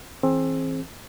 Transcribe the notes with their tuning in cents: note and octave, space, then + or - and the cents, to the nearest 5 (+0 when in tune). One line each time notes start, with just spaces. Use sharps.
E3 -5 C4 +20 G#4 +30